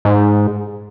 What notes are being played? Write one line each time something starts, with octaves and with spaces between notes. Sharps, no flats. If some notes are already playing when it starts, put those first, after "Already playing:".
G#2